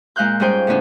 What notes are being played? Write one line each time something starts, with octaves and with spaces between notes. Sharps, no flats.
A#2 G#3 F5 F#6 G6
G#2 G3 C#4 G#4 C5 G5
A2 C#3 B3 C#4 D4